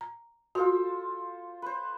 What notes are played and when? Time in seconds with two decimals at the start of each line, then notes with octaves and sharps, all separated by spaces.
0.01 A#5
0.55 F4 F#4 A4 C5
1.62 B4 C5